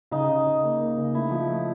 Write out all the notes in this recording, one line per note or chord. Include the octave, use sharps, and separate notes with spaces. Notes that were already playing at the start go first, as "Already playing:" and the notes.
C#3 D#4
C#3
C#3
A#3
A#3
C#3
A3 E4
F3
A3